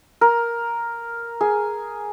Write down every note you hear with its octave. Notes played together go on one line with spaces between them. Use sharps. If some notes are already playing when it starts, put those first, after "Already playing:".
A#4
G#4